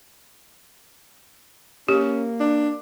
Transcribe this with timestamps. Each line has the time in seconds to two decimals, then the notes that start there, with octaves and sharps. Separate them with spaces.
1.88 A#3 C#4 G4
2.40 D4